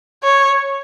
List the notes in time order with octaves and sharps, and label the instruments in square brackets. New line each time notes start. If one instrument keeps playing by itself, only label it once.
[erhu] C#5